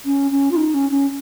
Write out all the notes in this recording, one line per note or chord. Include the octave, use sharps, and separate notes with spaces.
C#4
C#4
F4
D#4
C#4
C#4